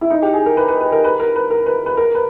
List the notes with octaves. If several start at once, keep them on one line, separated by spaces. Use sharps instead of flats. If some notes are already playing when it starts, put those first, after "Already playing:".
E4
D#4
G4
G#4
A#4
B4
B4
B4
A#4
B4
A#4
B4
A#4
B4
B4
A#4
B4